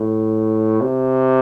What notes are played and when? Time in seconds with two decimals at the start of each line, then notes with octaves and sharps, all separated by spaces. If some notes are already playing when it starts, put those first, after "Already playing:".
Already playing: A2
0.81 C3